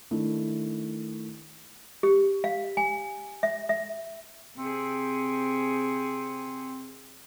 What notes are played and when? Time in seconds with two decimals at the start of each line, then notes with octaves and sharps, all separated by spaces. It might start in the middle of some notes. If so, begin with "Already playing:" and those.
0.11 D#3 A3 D4 E4
2.03 G4
2.44 F5
2.77 G#5
3.43 E5
3.69 E5
4.57 C3 C4 G#4